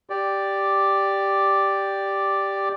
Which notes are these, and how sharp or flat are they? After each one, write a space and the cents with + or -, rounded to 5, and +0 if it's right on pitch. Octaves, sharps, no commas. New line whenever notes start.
G4 +0 D5 +0